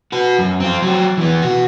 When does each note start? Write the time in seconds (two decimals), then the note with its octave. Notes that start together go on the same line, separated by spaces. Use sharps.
0.12 F#4 B4
0.39 F#2
0.60 C4 F4
0.82 F#3 G4
1.17 E3 B3
1.42 B2 F#4